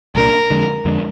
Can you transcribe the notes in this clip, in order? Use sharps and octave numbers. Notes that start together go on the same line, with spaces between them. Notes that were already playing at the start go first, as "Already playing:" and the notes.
C2 A#2 G#3 D4 A#4
F2 D3 G#3 D4
F2 D3 G#3 D4